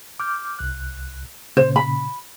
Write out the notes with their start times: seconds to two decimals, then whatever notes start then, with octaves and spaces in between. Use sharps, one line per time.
0.20 D6 F6 G6
0.59 C2 F#6
1.57 A#2 C#3 C5
1.76 B5